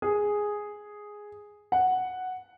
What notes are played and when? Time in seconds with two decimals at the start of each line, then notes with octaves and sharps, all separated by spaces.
0.02 G#4
1.72 F#5